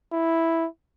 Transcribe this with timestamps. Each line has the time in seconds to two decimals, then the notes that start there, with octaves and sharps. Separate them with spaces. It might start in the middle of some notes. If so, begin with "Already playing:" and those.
0.13 E4